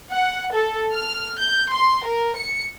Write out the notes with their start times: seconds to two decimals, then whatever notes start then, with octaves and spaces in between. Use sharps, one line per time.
0.12 F#5
0.55 A4
0.93 F6
1.38 G6
1.72 C6
2.05 A#4
2.36 C#7